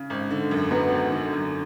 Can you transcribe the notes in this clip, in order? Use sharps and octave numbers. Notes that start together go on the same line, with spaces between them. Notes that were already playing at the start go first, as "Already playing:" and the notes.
Already playing: C#3
G#1
D3
F#2
F#3 B3
G#1
D3
F#2